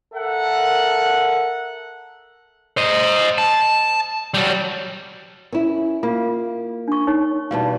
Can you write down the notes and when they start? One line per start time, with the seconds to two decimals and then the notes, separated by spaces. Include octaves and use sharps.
0.14 A4 A#4 E5 F#5
2.77 C5 D#5
3.38 A5
4.34 F#3 G3
5.53 C#4 E4 A#4
6.03 A#3 F4 F5
6.88 D4 C#6
7.07 D#4 A#4 C#5
7.51 E2 B2 G3 F5 A5